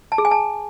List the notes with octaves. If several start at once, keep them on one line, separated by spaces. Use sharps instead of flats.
A5
G#4
G#5
A5